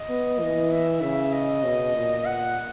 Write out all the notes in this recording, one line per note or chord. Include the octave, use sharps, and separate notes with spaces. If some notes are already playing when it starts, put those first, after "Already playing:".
Already playing: D#5
B3
E3
E5
C#3 E5
D#5
B2
A#2
F#5